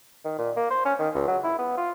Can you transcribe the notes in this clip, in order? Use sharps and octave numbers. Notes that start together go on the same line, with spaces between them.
D#3
A#2
A#3
C5
C#4
D#3
C#2
F#3
E4
B3
F4